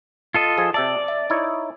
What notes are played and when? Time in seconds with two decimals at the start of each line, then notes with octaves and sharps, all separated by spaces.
0.34 F4 A4 D#5
0.58 F3 G#4
0.74 C3 D5 E5 A5
1.08 E5
1.30 D#4 E4 C#5